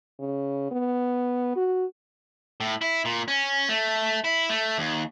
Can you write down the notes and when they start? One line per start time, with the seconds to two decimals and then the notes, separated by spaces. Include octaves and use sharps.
0.20 C#3
0.72 B3
1.56 F#4
2.60 A2
2.82 E4
3.05 A#2
3.28 C#4
3.69 A3
4.24 E4
4.50 A3
4.78 D#2